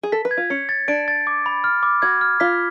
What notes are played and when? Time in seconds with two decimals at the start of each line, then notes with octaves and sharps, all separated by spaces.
0.03 G#4
0.12 A4 B6
0.25 B4
0.31 G#6
0.37 F4
0.50 C#4 C#7
0.69 A6
0.88 D4 D7
1.08 A6
1.27 D6
1.46 B5
1.64 F6
1.83 D6
2.02 F#4 G#6
2.21 F6
2.40 F4 B6